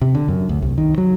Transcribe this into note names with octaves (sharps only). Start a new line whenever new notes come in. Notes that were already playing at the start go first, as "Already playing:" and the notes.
C3
D3
F#2
D2
C2
D#3
F#3